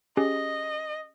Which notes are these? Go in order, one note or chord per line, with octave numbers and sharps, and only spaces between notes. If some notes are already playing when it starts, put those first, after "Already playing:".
C#4 G4 G#4 D#5